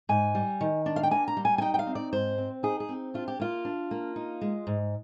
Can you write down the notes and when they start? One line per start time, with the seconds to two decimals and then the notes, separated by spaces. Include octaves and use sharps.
0.09 G#2 G#5
0.35 G3
0.61 D#3
0.86 D4
0.96 F5
1.03 G5
1.11 A#3 G#5
1.28 A#5
1.37 G3
1.45 G#5
1.58 G#5
1.61 D#4 G5
1.74 G5
1.79 F5
1.87 C4
1.95 D5
2.13 G#2 C5
2.38 C4
2.63 D#4 G#4
2.80 G#4
2.89 C4
3.14 D4 F4
3.28 G4
3.40 A#3 F4
3.65 D4
3.91 A#3
4.16 D#4
4.41 G#3
4.67 G#2